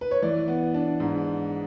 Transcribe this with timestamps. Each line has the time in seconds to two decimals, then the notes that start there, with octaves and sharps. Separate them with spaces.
0.01 B4
0.11 C#5
0.22 E3 D5
0.48 B3
0.74 D4
1.00 G#2